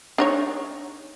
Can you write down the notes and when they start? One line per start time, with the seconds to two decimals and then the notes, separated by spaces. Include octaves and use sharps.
0.18 D4 D#4 C#5